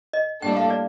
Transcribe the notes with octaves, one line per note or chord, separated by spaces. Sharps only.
D#5
A2 G3 A#3 D4 A4 G5
F5
D5